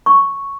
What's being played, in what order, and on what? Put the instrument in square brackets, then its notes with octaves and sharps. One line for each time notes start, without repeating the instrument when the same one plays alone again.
[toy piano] C#6